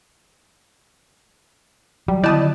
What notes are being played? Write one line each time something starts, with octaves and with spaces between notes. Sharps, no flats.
F#3 G3
D3 D#3 B3 E4 D5 D#5 A5 D#6